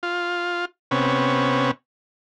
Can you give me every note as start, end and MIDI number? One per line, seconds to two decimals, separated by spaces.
0.03 0.65 65
0.91 1.71 48
0.91 1.71 59
0.91 1.71 61